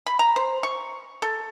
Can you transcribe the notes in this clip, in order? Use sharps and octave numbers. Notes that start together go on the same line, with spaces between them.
B5
A#5
C5
C#6
A4